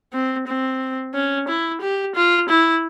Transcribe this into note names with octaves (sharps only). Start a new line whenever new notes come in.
C4
C4
C#4
E4
G4
F4
E4